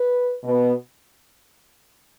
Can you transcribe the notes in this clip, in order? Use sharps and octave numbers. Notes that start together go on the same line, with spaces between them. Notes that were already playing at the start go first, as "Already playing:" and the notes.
Already playing: B4
B2 B3